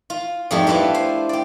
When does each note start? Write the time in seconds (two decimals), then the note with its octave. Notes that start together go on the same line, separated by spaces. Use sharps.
0.10 F4
0.51 F2 G#2 G3 A3 G4
0.67 D4 E4 F4 A4 B4
0.95 C5
1.29 G4 D5